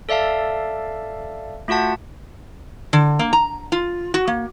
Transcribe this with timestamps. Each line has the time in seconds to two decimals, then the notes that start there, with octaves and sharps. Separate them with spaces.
0.09 A4 D5 E5 F5 A5
1.68 A3 F4 F#4 F#5 A5
2.93 D3
3.19 A#3
3.33 A#5
3.72 F4
4.14 F#4
4.27 A#3